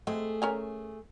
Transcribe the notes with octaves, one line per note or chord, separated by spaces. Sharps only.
G#3 A3 C4 G#4
C#4 A#4 G#5